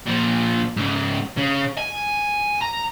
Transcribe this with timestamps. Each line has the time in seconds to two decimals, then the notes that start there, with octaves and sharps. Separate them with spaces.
0.07 A#2 F3
0.77 G#2 C#3
1.37 C#3
1.78 G#5
2.62 A#5